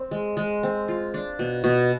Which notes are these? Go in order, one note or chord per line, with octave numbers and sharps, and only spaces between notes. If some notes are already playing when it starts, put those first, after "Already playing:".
Already playing: C4
G#3
G#3
C4
F4
D4
B2
B2